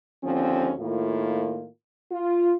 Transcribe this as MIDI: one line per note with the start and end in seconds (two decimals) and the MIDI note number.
0.24 0.72 39
0.24 0.72 50
0.24 0.72 53
0.24 0.72 60
0.24 0.72 61
0.80 1.66 45
0.80 1.66 51
0.80 1.66 58
0.80 1.66 65
2.12 2.54 65